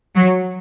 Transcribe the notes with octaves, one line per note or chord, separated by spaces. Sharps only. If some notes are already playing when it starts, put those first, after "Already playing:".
F#3